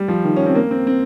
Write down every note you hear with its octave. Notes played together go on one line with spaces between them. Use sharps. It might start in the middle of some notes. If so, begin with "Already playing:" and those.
Already playing: G3
F3
D#3
C#4
C4
A#3
C4
C4